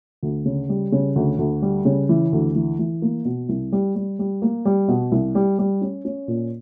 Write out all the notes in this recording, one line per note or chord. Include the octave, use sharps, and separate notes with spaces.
D2
C#3
G3
C#3
D2
D2
G3
C#3
E3
D2
E3
E3
A#3
B2
C2
G3
G3
G3
A#3
G3
B2
C2
G3
G3
C#4
C#4
A#2